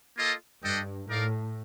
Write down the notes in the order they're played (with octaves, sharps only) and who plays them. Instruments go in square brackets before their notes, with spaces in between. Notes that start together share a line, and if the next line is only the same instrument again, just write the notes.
[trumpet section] A#3 F4 A4 D#5
[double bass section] G2 [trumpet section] D4 A4 D#5 G5
[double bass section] A2 [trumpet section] D#4 A#4 D5 F5